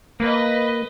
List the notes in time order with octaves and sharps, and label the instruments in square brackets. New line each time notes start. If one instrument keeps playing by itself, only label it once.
[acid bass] A#3 [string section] B4 D#5